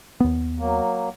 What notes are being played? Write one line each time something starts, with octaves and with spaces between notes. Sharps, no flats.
D#2 B3
F#3 A#3